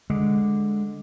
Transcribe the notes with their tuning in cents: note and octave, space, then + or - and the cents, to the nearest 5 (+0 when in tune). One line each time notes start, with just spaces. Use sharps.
D3 +0 G#3 -5